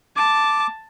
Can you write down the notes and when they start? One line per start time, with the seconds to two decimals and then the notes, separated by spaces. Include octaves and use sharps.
0.17 A5 D6